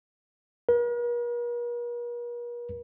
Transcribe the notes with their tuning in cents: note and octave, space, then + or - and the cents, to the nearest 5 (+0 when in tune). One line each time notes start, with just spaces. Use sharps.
A#4 +45